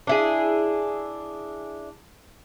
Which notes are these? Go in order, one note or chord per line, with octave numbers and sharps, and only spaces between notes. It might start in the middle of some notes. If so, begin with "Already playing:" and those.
D4 E4 G#4